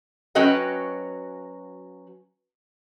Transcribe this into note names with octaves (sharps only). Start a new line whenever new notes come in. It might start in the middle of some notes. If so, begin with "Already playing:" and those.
F#3 C#4 F#4 B4 D#5 G5